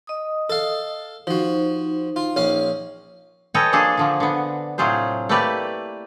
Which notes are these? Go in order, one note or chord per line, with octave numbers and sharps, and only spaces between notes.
D#5 D#6
A4 F5
F3 D#4 F#4 C5
F4
A#1 C#4 F5
A4 B4 C#5 D#5 G5 G#5
F3 A#3 D4 G#4 A4
D3 F3 A#3
D3 B3
A2 C3 F#3 F4 G#4 C5
A3 A#3 E4 G4 B4 D5